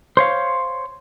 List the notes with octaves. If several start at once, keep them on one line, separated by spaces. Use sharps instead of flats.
C5 C#5 F5